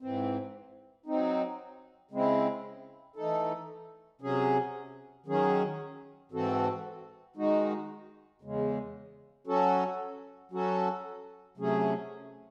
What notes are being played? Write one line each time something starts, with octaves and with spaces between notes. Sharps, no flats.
G#2 E3 C4
F#3 C4 D#4
C#3 G#3 C4 E4
E3 A3 D#4 A4
C3 F#3 C#4 G#4
D#3 F#3 C#4 G#4
G#2 E3 C4 F#4 A4
D#3 G#3 D#4 F#4
E2 C#3 G#3
F#3 C#4 F#4 A4
F#3 C#4 F#4 A4
C3 F#3 A3 C#4 G#4